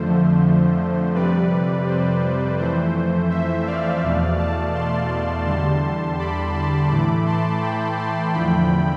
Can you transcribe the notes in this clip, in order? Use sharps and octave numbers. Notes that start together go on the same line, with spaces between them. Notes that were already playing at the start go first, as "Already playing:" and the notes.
Already playing: F2 D3 F3 A3 C5
F2 C3 G3 B4 D5
C5
F2 E3 A3 C5
C5 E5
D5 F5
E2 B2 A3
F5 A5
A5 C6
E2 D3 G3 A5 C6
B5 D6
A5 C6
A2 E3 A3 B5 D6
A5 C6
G5 B5
A5 C6
E2 D3 F3 A3 G5 B5